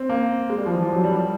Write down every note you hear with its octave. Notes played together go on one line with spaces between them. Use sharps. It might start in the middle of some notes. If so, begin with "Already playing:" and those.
Already playing: C4
A#3
G#3
G3
F3
E3
F3
F#3
G3
G3